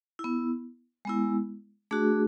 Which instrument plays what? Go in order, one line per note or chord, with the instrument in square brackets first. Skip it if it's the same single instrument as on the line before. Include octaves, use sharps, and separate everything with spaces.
[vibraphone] E4
B3
G#3 B3 E4
A3 D4 F#4 G#4